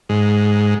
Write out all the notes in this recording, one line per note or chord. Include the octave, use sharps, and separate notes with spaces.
G#2